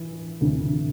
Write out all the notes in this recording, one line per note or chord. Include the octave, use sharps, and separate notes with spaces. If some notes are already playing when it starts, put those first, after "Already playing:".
Already playing: E3
D2 C3 E3